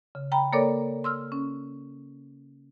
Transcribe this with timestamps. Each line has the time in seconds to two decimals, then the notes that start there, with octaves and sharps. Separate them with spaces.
0.15 C#3
0.32 G5 A#5 B5
0.53 A#3 A4 A#4 C#5 D5 D6
1.04 C6 E6 F6
1.32 C#4